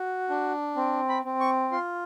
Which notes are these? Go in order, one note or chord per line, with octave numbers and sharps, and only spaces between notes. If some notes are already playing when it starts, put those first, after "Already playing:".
Already playing: F#4
D4
C4
B5
C4
C#6
F4 C6